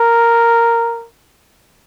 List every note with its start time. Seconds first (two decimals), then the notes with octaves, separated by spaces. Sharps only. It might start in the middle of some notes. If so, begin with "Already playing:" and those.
Already playing: A#4